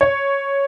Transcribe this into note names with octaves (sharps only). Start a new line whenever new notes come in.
C#5